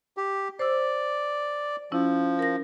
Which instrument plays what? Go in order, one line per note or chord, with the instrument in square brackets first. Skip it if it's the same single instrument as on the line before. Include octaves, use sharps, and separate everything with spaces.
[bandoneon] G4
[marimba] C5 E6 [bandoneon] D5
[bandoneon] F3 [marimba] C#4 E4
[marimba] A#4 A#6